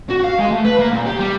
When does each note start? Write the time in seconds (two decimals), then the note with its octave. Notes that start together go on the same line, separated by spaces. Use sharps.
0.09 F#4
0.24 F5
0.38 G#3
0.51 A3
0.65 B4
0.79 A#3
0.94 A#2
1.06 G4
1.20 G3